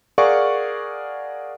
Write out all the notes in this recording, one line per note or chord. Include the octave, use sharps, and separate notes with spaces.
G#4 A#4 D5 F5 F#5 C#6